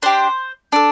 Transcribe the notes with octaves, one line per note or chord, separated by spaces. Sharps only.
D4 G4 C5
D4 A4